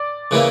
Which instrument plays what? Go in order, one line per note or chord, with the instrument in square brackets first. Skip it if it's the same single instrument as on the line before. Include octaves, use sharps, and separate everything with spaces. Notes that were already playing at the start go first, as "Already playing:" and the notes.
Already playing: [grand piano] D5 D6
[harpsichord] C#3 E3 A#3 E4